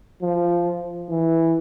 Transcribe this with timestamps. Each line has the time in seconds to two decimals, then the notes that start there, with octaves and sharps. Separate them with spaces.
0.23 F3
1.10 E3